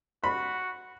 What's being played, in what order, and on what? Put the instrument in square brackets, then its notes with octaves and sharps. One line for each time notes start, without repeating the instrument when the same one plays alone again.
[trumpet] F#4 [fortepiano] B5